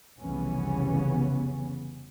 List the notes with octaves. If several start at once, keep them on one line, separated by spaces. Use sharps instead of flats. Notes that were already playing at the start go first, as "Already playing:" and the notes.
F1 C2 C#3 E3 B3 C#4